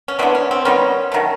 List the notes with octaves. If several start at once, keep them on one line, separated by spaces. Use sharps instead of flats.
C#4
E3 G#3 B3 C4 D4
C#4
C4
D#3 G3 B3 C#4
D#3 F#3 A3